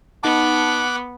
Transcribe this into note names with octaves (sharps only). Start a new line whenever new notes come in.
B3 D#4 F#5 A5 D6